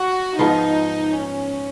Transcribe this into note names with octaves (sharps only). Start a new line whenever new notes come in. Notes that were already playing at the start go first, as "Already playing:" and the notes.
Already playing: F#4
G#2 F3 B3 D#4 F4
C#4